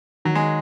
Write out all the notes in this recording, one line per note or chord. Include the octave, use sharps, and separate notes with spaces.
D#3 F#3
G#3